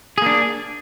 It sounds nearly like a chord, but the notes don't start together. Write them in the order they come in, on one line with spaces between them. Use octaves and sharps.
G#4 A#3 D4